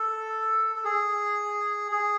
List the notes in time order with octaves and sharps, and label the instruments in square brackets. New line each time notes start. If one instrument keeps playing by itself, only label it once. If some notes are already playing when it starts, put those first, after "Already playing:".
Already playing: [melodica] A4
A4
G#4
G#4